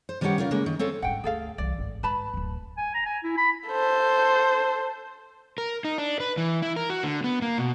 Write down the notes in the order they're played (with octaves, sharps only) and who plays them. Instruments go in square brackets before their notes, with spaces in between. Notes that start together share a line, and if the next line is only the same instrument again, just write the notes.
[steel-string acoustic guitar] C5
D#3 G3 B3 C#4 G4 F#5
C#3 F4 A#4 F5
C#3 G#3 A#3
D#3
C4 C#4 A4 F5
[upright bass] G#2 G3 [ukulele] F#5 G5
[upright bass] D2 [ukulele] G#4 A4 F5
[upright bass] C2 E3 [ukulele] D5
[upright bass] G#1
[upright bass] G#2 [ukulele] B4 A5 B5
[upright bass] D1 F#2
[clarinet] G#5
A#5
G#5
E4
B5
[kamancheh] A4 C5
[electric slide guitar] A#4
D#4
D4
B4
E3
E4
A#4
F#4
D3
B3
A#3
B2